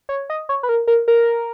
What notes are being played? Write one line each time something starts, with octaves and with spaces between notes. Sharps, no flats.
C#5
D#5
C#5
B4
A#4
A#4
A#4